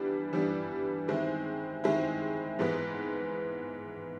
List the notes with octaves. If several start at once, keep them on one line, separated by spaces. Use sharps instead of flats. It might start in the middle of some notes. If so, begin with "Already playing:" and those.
Already playing: E3 G3 B3 D4
E3 G3 B3 D4
D#3 G#3 C4 E4
D#3 G#3 C4 E4
G#2 E3 G#3 B3